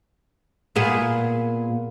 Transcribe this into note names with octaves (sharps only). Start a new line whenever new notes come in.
A#2 B3 G#4